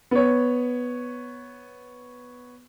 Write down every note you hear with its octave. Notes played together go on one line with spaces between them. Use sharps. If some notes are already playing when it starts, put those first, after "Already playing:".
B3 C#5